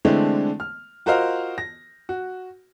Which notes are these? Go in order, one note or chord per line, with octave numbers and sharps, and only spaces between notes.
D3 E3 G#3 A3 C4 D4
F6
F4 F#4 A#4 C5 D#5 F5
A#6
F#4